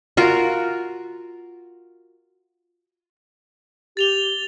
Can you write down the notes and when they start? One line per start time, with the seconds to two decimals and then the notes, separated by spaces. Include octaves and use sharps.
0.17 F4 F#4 A#4
3.97 G4 A6 F7 G7